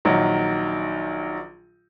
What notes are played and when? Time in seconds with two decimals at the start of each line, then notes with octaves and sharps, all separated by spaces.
0.05 A#1 D#3 F#3